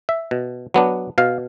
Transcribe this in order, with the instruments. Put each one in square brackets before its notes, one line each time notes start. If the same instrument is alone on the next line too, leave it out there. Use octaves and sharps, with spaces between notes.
[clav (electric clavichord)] E5
B2
F#3 B3 D4
B2 F5